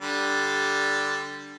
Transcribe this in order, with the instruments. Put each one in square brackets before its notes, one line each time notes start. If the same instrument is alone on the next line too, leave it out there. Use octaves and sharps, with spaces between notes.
[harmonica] D3 G3